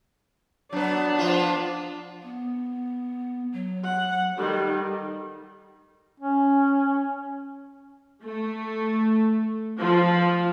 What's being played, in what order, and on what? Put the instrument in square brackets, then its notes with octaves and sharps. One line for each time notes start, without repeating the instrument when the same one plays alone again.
[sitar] F#3 B3 [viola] D4
[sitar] F3 B3 F4
[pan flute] B3
F#3
[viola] F#5
[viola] D#3 G3 [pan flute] A4
[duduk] C#4
[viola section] A3
F3